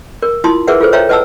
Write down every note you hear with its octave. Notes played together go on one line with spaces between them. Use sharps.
A#4
E4 F4 A5 C6 D#6
G#4 A#4 B4 E5 F#5
F4 G#4 A4 B4 C5
C5 C#5 E5 F5 G5 A#5
B4 D#5 F#5 A5 E6